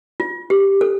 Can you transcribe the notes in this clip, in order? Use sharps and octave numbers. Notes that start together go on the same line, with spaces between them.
F4
G4
A4